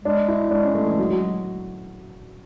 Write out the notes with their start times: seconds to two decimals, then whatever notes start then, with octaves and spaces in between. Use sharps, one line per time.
0.04 G#3 D4
0.28 E4
0.51 G#3 D4
0.64 C#4
0.75 A3
0.86 E3
0.99 F#3
1.10 F#3